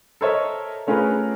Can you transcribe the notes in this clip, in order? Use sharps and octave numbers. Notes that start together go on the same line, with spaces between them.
A4 A#4 C5 C#5 D#5 E5
A3 C#4 F4 G#4 A#4 B4